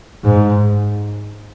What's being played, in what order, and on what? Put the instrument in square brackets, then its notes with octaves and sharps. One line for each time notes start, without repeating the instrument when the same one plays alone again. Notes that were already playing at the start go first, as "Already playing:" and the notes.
[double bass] G#2